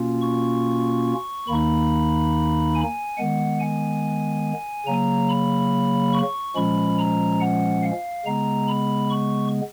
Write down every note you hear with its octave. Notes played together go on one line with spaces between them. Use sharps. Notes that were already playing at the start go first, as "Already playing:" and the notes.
Already playing: B2 A#3 C#4 F4
C#6
D#2 D#3 A#3 D#4 B5
G#5
D#3 G#3 B3 F#5
G#5
C#3 F#3 A#3 A#5
B5
C#6
A#2 F3 G#3 C#4 B5
A#5
F#5
F5
C#3 G#3 B3 A#5
B5
C#6